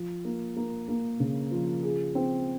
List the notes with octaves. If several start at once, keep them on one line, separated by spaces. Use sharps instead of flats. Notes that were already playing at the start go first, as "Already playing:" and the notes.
Already playing: F3
A#3
A#3
A#3
C#3
F3
G#4
C4